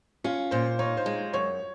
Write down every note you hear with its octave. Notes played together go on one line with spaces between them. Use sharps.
C#4 F4
A#2 C5
D#4 C#5
C5
G#3
F#2 C#5